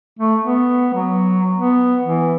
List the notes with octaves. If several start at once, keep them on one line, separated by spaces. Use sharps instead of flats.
A3
B3
F#3
B3
E3